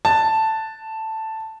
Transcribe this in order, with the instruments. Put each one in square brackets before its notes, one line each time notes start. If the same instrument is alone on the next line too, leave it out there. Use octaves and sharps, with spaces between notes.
[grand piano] A5